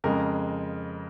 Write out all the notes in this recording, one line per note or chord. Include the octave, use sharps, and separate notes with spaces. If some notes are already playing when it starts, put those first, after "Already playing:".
F2 C#3 G#3 A#4